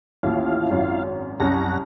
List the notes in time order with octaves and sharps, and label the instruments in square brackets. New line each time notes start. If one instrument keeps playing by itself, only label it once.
[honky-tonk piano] A1 D#2 [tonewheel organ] E4 F4 F5
[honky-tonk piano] G#1 F#2
[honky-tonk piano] C2 C#4 [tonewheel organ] F#2 F#5 A#6